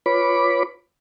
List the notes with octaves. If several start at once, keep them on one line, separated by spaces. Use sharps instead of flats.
F4 B4 C#5 B5 D6